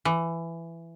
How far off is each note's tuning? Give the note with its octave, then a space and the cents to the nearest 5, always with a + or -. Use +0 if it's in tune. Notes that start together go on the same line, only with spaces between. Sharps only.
E3 +15